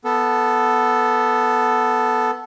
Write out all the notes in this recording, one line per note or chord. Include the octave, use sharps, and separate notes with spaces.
B3 A4